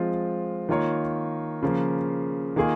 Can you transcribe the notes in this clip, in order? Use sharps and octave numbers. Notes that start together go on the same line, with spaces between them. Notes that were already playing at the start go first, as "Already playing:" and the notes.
Already playing: F3 G#3 C4 F4
D#3 A#3 F4 A#4 C#5
C#3 F3 A#3
D#3 A#3 F4 G#4